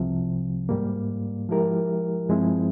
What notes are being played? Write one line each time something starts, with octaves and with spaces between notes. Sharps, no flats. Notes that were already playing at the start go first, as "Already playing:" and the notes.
Already playing: C2 C3 F3
G#2 G3 A#3
F3 G#3 E4 G4 A#4
G2 F3 G#3 C4 E4